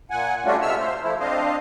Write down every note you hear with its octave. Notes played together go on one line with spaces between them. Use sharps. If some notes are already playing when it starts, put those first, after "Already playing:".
A#2 F#5 G#5
G3 A3 C#4 D4 F4 F#4
C3 G#3 E5 E6 F6
C5
F3 A3 E4
C4 D4 C5 D#5 F5